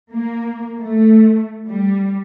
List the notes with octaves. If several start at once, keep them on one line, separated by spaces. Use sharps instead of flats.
A#3
A3
G3